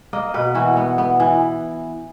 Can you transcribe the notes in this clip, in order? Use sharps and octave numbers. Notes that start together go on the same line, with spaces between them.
A#3 D#5
B2 B4
E3 F#4
B3
B3
E3